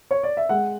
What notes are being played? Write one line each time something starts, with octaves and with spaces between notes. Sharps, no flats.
C#5
D5
E5
G#3 F#5